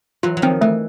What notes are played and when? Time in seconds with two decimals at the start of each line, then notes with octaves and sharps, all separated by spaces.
0.23 E3 F#3 F4
0.37 F#3
0.42 D#3 F3 C4
0.61 E3 A3